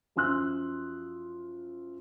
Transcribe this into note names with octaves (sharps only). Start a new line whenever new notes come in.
F#2 F3 C6 E6 F#6